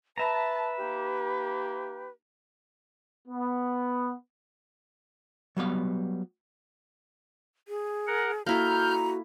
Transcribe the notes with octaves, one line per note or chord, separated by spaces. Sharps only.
B4 E5 A5 A#5
A#3 D#4 G4
B3
F#3 G3 B3 F5
G#4
A#4 F#5
A#3 E4 F#4 A4 A#5 F6 G6